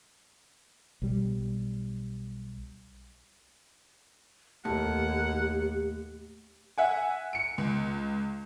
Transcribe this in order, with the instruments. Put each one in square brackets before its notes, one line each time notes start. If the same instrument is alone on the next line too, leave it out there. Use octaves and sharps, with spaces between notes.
[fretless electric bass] B1 G3
[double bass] D#2 [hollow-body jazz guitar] A2 [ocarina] G4 [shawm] F#5
[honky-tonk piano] E5 F#5 G#5
C#7 D7
C#2